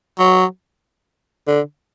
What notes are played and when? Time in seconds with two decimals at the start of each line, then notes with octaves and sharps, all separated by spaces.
0.19 F#3
1.47 D3